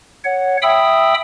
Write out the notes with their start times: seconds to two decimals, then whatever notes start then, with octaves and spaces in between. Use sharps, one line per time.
0.25 C#5 F#5
0.62 E5 G5 B5 D#6 E6